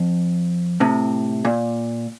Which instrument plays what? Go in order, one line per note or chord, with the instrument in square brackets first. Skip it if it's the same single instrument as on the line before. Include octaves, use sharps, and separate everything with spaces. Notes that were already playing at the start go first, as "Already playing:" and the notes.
Already playing: [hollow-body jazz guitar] F2
A2 C3
A#2